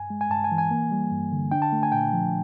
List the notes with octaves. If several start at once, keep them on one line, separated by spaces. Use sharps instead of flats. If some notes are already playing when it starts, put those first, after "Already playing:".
Already playing: G2 G#5
G#3
G#5
G2 A5
G#5
E3
G#5
A#3
G3
G2
D3
D4 G5
A5
A3
G#5
A#2 G5
F3